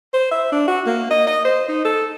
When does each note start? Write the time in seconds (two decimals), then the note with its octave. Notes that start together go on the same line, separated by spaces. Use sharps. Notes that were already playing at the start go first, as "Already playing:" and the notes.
0.13 C5
0.31 E5
0.52 D4
0.68 F#4
0.86 A#3
1.11 D#5
1.27 D#5
1.45 C5
1.68 D#4
1.85 A4